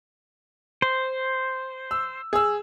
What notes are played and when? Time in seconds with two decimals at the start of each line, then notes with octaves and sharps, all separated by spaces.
0.82 C5
1.91 E6
2.33 G#4 E6